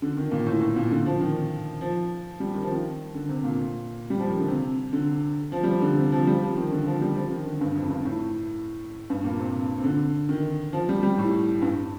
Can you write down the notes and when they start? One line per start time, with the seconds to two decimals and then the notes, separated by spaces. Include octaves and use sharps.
0.02 D3
0.17 D#3
0.32 A#2
0.46 A2
0.61 A2
0.76 A#2
0.91 D3
1.06 F3
1.20 D#3
1.81 F3
2.40 G3
2.54 D#3
2.63 F3
2.71 D#3
3.15 D3
3.29 C3
3.44 A#2
4.10 G3
4.19 F3
4.29 D#3
4.39 D3
4.48 C3
4.93 D3
5.52 F3
5.63 G3
5.67 F3
5.82 D3
5.96 C3
6.12 F3
6.27 G3
6.42 F3
6.57 D#3
6.71 D3
6.86 F3
7.01 G3
7.16 F3
7.31 D#3
7.46 D3
7.61 G2
7.75 F2
7.90 G2
8.05 A2
9.10 G2
9.24 A#2
9.39 C3
9.79 C3
9.84 D3
10.29 D#3
10.73 F3
10.89 G3
11.03 G3
11.18 A2
11.62 G2